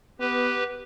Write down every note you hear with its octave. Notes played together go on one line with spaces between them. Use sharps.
B3 G4 B4